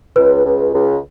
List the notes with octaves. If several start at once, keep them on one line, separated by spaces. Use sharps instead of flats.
C#2 B4
C#2
C#2